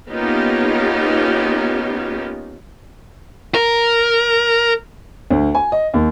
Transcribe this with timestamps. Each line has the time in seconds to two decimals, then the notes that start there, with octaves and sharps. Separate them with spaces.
0.10 A#3 B3 C#4 D#4 F4 G4
3.55 A#4
5.31 D2
5.55 G#5
5.72 D#5
5.94 D#2